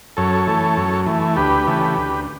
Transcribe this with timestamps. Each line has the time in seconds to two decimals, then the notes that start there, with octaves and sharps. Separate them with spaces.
0.17 F#2 A4 C#5
0.47 E3 A3
0.77 F#2
1.06 E3 A3
1.36 D2 G4 B4
1.67 C#3 E3 A3
1.97 D2